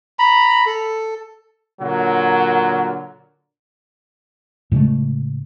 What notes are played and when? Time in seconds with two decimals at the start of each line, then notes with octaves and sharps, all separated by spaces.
0.19 A#5 B5
0.66 A4
1.82 A#2 D3 F#3 A#4
4.72 A2 C#3 G#3 A3